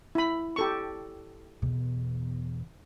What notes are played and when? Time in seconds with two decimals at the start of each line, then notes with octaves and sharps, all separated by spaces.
0.15 E4 B5
0.56 G4 A4 C#6
1.62 E2 B2